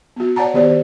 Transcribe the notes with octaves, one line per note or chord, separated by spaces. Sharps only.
B3 F#4
C#5 D5 F#5 A5 A#5
D#3 B3 G4 C5 D5